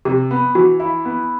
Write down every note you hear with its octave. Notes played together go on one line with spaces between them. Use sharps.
C3 G4
B3
E3 F#4
E4
B3